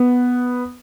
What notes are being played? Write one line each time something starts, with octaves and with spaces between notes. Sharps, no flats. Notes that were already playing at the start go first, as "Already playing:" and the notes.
Already playing: B3